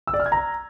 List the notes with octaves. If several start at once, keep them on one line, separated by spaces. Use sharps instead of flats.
E6
D5
F6
G#6
A#5